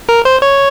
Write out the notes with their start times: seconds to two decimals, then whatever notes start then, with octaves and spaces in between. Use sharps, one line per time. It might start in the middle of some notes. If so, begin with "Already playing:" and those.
0.09 A#4
0.25 C5
0.42 C#5